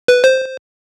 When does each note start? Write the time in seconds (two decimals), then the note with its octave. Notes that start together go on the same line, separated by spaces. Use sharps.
0.08 B4
0.24 C5